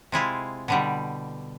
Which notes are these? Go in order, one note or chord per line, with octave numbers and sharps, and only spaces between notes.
C3 G#3 E4 F4
B2 D3 G3